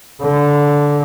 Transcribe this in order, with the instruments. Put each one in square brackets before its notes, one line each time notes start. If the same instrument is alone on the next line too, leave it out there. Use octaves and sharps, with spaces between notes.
[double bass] D3